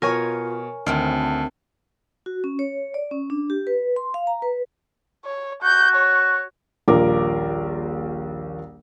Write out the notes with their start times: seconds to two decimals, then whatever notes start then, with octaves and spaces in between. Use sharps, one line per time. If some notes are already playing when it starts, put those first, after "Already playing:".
0.02 B2 F4 A#4 C#5 G#5
0.86 D2 D#3 C4 E4 A5 F6
2.26 F#4
2.44 C#4
2.59 C#5
2.94 D5
3.11 C#4
3.30 D4
3.50 G4
3.67 B4
3.96 C6
4.14 F5
4.27 A#5
4.42 B4
5.25 C#5
5.63 F#4 G6
5.95 C#5
6.88 D#1 A#1 F4 A#4 D6